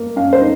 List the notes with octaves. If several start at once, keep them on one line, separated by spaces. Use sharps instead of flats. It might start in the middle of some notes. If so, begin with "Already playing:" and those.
Already playing: A#3
F#2 F5
C5
D#4